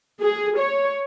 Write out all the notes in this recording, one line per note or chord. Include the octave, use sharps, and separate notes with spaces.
G#4
C#5